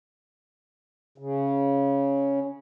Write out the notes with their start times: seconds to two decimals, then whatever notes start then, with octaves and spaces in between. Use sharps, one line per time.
1.18 C#3